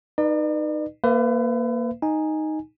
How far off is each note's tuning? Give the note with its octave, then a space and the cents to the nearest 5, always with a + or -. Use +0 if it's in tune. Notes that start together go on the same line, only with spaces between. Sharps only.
D#4 -10 B4 -20 D5 +45
A#3 +0 B4 +35 E5 +40
D#4 +0 G#5 -5